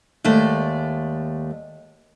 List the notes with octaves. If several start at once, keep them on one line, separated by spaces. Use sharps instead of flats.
D#2 G#3 A3 D5